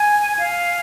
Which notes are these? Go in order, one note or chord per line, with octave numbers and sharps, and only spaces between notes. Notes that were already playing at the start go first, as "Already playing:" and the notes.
Already playing: G#5
F5